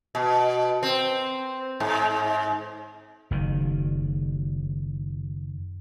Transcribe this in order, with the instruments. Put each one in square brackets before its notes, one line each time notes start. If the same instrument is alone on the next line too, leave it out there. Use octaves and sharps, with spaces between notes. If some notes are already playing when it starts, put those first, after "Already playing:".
[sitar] B2
C4
G#2
[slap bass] F#1 D#3